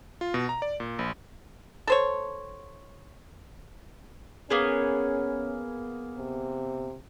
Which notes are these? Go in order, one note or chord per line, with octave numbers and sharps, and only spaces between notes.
F4
B2
A#5
D5
A#2
A#1
A4 C5 C#5
A#3 B3 C#4 G#4
C3